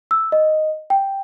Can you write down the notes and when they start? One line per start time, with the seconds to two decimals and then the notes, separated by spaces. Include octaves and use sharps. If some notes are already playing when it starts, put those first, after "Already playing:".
0.11 E6
0.32 D#5
0.90 G5